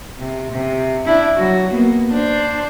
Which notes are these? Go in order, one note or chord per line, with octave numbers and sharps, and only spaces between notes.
C3
C3
D4 E4
F#3 F#4
A#3 B3
D4 C5